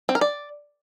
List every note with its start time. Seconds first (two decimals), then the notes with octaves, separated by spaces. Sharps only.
0.09 C4
0.15 A#4
0.21 D5